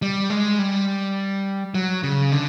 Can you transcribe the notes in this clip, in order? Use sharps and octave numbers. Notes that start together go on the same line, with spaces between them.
G3
G#3
G3
F#3
C#3
D3